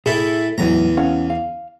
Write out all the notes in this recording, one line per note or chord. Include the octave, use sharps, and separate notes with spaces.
A2 A3 E4 G#4
E2 A2 F#3 A#5
C#4 F5 F#5
F5